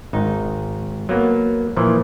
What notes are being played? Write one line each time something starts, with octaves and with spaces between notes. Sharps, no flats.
G#1 D#4
F#3 A#3 B3
A#2 E3 F3